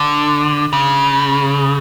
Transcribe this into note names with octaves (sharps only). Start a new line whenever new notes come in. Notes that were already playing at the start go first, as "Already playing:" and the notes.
Already playing: D3
C#3